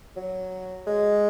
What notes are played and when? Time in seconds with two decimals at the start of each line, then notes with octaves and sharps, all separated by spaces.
0.16 F#3
0.87 G#3